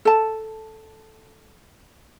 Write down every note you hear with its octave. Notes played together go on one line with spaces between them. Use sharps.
A4 A5